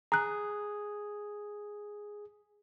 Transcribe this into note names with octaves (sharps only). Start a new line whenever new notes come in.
G#4 A#5 F#6